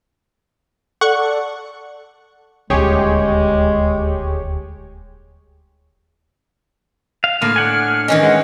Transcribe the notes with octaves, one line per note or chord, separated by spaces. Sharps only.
A4 D5 F#5 C#6
D#1 D2 G#3 G4 G#4 C#5
F5
A2 D3 A#3 F6
D4 F#5 G#5
D#3 E3 C#4 D#5
G#3 F#5